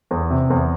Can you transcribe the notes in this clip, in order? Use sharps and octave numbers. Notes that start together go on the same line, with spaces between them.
E2
C3
E2